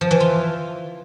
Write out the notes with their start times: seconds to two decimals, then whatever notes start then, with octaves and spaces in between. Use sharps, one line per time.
0.01 F3
0.11 E3
0.20 F4